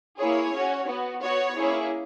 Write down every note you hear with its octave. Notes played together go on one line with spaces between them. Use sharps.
A#3 E4 G#4 C#5
C#4 F#4
B3 F#4
B3 F#4 C#5
A#3 C#4 E4 G#4